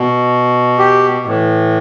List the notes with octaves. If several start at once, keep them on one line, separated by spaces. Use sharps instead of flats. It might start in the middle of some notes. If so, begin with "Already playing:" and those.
Already playing: B2
G4
A2 E3